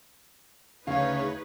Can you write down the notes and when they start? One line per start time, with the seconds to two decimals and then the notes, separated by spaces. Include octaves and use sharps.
0.87 D2 C#3 D#4 G#4 B4 C#5 F5